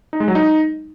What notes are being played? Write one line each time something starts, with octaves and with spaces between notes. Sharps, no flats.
D#4
G#3
F#3
D#4